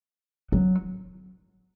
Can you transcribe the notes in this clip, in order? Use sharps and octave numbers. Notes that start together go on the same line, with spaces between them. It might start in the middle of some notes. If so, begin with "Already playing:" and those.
F#3